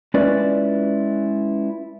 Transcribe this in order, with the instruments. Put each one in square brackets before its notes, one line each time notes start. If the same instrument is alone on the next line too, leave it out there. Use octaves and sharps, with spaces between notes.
[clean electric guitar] G#3 C#4 E4 F4 B4 D5